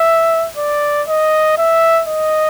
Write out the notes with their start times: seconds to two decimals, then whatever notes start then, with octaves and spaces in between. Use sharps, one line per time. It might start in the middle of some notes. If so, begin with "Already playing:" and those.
Already playing: E5
0.57 D5
1.08 D#5
1.58 E5
2.08 D#5